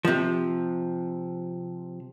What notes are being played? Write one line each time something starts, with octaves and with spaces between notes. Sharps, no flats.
C3 F3